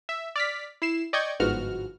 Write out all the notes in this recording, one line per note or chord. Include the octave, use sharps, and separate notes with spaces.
E5
D5 F6 B6
E4 C7 E7
D5 D#5 G5 C#6 G6 G#6
G1 G#2 F3 B3 F#4 F6